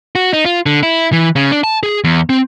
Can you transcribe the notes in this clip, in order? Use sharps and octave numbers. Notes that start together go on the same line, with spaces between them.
F#4
D#4
F4
D3
E4
E3
C#3
D4
A5
G#4
E2
C4